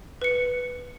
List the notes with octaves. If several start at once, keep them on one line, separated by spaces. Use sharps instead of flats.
B4 C#7